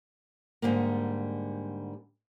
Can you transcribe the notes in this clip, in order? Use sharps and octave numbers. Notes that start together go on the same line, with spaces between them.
G#2 D3 G3 A#3